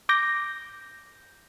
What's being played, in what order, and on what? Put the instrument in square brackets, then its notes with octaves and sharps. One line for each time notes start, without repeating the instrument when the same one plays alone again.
[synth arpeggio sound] D6 G6 A#6